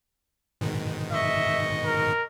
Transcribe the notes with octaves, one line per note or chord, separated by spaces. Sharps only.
G#2 B2 D#3
D#5 E5 C#6
A#4